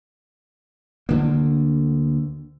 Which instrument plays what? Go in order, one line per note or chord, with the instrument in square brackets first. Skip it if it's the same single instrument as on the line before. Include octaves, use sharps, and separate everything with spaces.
[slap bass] D2 D3 A#3